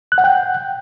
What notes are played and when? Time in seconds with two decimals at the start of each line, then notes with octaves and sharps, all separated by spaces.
0.12 F#6
0.18 F#5
0.24 G5